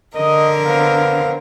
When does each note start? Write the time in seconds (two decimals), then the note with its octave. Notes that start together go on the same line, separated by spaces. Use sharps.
0.15 D3 A#4 D#5
0.67 B3 C4 F5